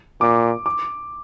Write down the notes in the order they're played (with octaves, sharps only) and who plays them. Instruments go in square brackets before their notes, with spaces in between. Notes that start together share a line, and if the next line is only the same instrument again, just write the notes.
[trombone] A#2 [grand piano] D6
[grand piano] D6